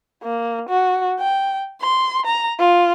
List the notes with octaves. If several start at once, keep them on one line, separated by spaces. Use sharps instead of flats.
A#3
F#4
G5
C6
A#5
F4